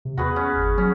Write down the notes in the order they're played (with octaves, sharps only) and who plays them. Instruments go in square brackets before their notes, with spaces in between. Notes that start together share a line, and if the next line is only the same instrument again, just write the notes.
[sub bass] C3
[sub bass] E2 [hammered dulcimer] F#4 G#4 B4
[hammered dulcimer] C#4
[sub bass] G1
[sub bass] F#3 [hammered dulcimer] C#4